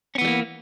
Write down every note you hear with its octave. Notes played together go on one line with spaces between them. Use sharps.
E3 G3 A#3 B3 C#4